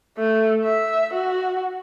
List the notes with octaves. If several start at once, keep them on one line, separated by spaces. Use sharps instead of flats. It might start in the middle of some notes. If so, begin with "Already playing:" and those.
A3
E5
F#4